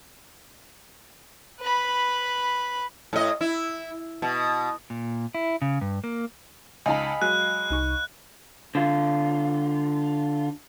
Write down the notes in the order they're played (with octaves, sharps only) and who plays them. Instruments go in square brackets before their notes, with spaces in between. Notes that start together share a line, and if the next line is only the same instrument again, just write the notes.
[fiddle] B4 B5
[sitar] A2 D#5
E4
B2
[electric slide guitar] A#2
E4
C#3
G2
A#3
[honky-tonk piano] C#2 D#4 A5 [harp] D#5 F5 B5 [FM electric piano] G#5
[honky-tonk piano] F#3 G#3 [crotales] F#6
[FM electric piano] C2 D#4 C#6
[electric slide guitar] D3 F4